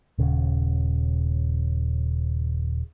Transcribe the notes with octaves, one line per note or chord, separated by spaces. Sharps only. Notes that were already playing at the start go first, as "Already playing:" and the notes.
D#1 C#3